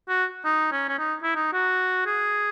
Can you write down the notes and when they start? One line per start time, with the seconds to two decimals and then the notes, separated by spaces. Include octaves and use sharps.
0.09 F#4
0.45 D#4
0.72 C#4
0.88 C#4
0.98 D#4
1.23 E4
1.35 D#4
1.53 F#4
2.06 G#4